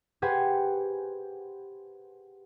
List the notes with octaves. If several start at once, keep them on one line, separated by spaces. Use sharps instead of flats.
G4 G#4 B4 C5 F#5 G#5